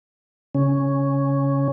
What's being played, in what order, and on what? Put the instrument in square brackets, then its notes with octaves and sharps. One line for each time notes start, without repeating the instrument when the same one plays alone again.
[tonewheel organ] C#3 C#4